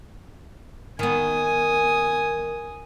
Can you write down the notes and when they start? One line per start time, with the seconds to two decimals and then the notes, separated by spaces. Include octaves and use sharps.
0.99 D#3 B3 G#5 D#6